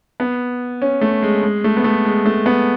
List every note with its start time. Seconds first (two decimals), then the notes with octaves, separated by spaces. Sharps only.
0.20 B3
0.82 C#4
1.01 A3
1.23 G#3
1.43 G#3
1.64 A3
1.77 B3
1.84 A3
2.05 G#3
2.26 A3
2.46 B3